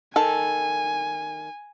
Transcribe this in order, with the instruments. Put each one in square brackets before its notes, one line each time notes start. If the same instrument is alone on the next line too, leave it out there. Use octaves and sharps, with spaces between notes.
[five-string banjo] D#3 A4 [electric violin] G#5